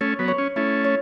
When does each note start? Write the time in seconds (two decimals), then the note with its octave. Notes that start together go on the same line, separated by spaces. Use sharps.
0.01 A3 C#4 C#5
0.19 F#3 B3
0.28 C#5
0.38 C#4
0.56 A3 C#4 E4
0.84 C#5